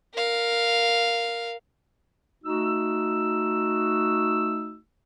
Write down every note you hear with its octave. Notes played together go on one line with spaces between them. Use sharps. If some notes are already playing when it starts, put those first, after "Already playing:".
A#4 F5
A3 D#4 F#4 E6